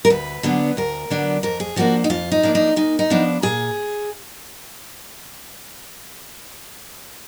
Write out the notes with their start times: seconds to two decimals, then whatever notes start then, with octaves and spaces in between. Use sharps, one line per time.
0.05 A#4
0.10 D2 B4
0.43 D3 F#3 B3 D4
0.77 D2 A#4
1.10 D3 F#3 B3 D4
1.43 F2 A#4
1.60 G#4
1.76 F3 A#3 D4 F#4
2.04 D#4
2.10 F2 F4
2.32 D#4
2.43 F3 A#3 D4
2.55 D#4
2.76 A#2 D#4
2.99 D#4
3.10 F3 B3 D4
3.42 A#2 G#4